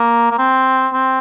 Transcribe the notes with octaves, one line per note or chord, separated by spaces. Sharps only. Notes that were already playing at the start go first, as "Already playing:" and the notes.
Already playing: A#3
A#3
C4
C4